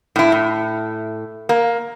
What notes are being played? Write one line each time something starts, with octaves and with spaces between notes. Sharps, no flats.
A2 E4
A2
A#3